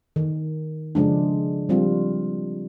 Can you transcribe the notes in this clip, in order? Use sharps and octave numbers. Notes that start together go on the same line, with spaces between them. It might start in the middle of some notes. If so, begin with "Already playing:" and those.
D#3
C#3 F3 G#3 D4
F3 G3 C4 F4